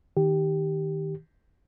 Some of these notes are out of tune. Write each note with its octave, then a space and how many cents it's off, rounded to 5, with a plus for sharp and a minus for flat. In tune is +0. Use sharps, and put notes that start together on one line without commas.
D#3 +0 G4 +0